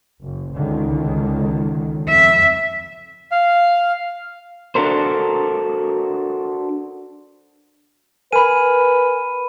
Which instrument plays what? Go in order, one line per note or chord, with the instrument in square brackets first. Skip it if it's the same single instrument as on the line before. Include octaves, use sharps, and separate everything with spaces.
[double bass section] F#1
C#2 D3 D#3
[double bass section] F2 [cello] E5
[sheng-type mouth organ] F5
[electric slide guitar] D4 F#4 A4 A#4 C5
[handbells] A#4 G#5 [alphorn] B4 [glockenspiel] B5 D#7